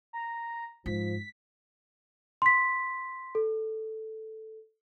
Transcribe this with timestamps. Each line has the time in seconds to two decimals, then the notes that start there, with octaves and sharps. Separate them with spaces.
0.13 A#5
0.86 G#2 F3 B6
2.42 C6 B6
3.35 A4